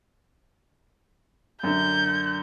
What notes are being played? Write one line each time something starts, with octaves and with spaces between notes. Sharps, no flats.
F#2 D3 G6